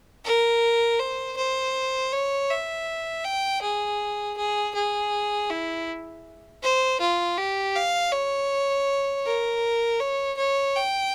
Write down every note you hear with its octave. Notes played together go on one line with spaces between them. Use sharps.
A#4
C5
C5
C#5
E5
G5
G#4
G#4
G#4
E4
C5
F4
G4
F5
C#5
A#4
C#5
C#5
G5